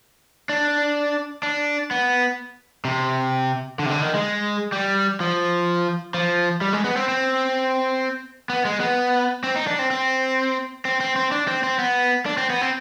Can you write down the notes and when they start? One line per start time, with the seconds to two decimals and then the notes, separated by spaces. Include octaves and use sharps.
0.49 D4
1.43 D4
1.91 B3
2.85 C3
3.79 D3
3.86 C3
3.91 D3
4.02 D#3
4.14 G#3
4.72 G3
5.20 F3
6.14 F3
6.61 G3
6.73 G#3
6.84 B3
6.96 C4
7.09 C4
8.50 B3
8.65 G#3
8.80 B3
9.44 C4
9.56 D#4
9.67 D4
9.79 C4
9.91 C4
10.85 C4
11.01 C4
11.16 C4
11.32 D4
11.48 C4
11.64 C4
11.79 B3
12.26 D4
12.38 C4
12.50 B3
12.61 C4